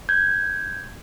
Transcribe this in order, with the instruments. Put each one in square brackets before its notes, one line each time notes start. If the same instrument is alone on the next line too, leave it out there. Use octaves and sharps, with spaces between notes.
[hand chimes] G6 G#6